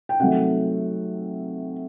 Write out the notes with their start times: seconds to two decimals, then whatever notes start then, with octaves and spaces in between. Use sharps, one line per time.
0.09 G5
0.20 C3 D#3 F#3 A3 F#5